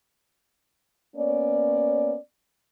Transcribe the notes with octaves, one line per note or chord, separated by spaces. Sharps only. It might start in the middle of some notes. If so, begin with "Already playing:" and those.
A#3 B3 C#4 C#5 D5